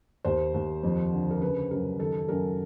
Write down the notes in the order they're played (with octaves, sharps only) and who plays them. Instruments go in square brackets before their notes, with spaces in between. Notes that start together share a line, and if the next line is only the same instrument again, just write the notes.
[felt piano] D#2 C5
D#2
F2
D3
A#4
C#3 B4
F#2 A#4
D#3 A4
F#2 A#4